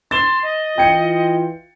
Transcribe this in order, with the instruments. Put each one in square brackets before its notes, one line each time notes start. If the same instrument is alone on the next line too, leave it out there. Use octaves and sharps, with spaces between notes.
[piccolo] C6 [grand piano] A6 E7 G7
[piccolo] D#5
[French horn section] E3 F4 [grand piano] G5 G#6 C#7